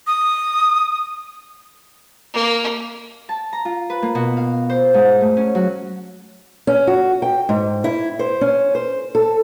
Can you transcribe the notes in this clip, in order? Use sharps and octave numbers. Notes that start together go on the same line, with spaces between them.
D#6
A#3
A5
A#5
F4
B4
A#3
B2
F5
C5
G#2
A3
C#4
F#3
C#4
F#4
G5
G#2
E4
C5
C#4
C5
A4